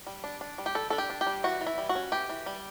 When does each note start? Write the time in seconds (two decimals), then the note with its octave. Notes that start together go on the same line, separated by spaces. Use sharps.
0.07 G3
0.24 D4
0.41 D4
0.58 G3
0.66 G4
0.75 G3 A4
0.90 D4 A4
0.98 G4
1.10 D4
1.21 G4
1.27 G3
1.44 E3 F#4
1.61 E3
1.67 E4
1.78 G3
1.89 F#4
1.95 C#4
2.12 E3 G4
2.29 E3
2.46 G3